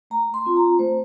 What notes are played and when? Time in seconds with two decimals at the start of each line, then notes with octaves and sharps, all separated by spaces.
0.10 A3 A#5
0.34 C6
0.46 C4 F4
0.56 A#5
0.79 A3 C5